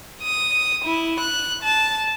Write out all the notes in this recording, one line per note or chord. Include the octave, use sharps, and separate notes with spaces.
D#6
E4
F#6
A5